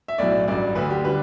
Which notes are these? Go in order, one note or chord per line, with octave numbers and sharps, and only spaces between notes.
E5
B1 A2 F#3 D5
A1 G2 F#3 D5
D2 D3 F#3 B4
G4
D3 G3 B4